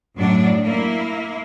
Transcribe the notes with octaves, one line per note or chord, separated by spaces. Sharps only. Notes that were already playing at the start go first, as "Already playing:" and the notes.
F#2 A2 F#3 D4 D5
A#3 E4